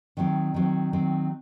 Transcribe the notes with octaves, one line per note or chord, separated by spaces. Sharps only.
D#3 F#3 C4
D#3 F#3 C4
D#3 F#3 C4